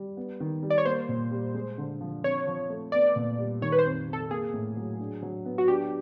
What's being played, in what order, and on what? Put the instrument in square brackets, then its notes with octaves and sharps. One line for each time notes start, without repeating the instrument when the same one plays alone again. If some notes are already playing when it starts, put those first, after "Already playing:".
Already playing: [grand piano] G3
B3
D#3
G3
[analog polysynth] D5
C#5
[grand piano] A#3 [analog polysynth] C5
[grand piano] A#2
G3
G#3
D3
F3
[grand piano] C4 [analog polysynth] C#5
[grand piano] F3
A3
[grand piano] B3 [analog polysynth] D5
[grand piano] A#2
G3
[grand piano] D#3 [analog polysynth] C#5
[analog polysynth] B4
C5
[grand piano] F2
C3
[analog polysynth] A4
[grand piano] A#3 [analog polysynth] G#4
[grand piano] A2
F#3
D4
F#3
B3
[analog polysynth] F#4
[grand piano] D4 [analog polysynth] G4